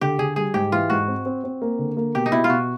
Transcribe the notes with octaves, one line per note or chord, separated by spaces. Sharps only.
D3 G4
D3 G#4
G3 G#4
G#2 G4
E3 F4
G#2 F#4
C4
C4
C4
A#3
D3
A#3
B2 G4
D#4
B2 E4
F4
B2 F#4